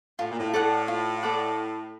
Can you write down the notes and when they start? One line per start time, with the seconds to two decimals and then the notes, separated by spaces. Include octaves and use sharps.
0.19 A2 F4
0.29 A#2
0.38 A2
0.54 A2 A4 D5 F#5
0.88 F4
1.22 A4 D5 F#5